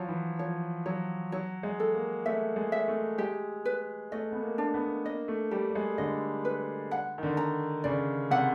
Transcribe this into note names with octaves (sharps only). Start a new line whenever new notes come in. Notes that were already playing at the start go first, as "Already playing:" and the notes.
Already playing: F3 F#3 C#5
E3
F3 C#5
F#3 C#5
F#3 C#5
G#3
A4
A#3
A3 E5
G#3
E5
A3
G#3 G4
B4
A3 D#5
B3
A#3
D4
B3
A#3 D#5
A3
G3 G4
G3
G#3
D3 D#5
B4
F#5
D#3
D3
A#5
C#3 D5
C3 F#5